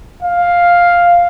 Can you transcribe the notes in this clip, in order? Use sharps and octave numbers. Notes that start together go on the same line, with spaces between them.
F5